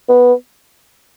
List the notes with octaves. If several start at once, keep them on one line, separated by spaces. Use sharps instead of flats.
B3